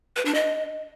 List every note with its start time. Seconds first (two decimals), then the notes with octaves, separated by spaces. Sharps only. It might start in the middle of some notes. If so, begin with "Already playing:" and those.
0.16 B4
0.25 D4
0.35 D#5